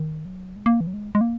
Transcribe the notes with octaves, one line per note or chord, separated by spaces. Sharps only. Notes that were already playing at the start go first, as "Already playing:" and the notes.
Already playing: D#3
F#3
G#3
A#3
E3
F#3
G#3
G#3
A#3